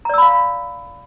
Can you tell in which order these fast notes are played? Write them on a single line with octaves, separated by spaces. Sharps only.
A#5 D5 E6 B5 F5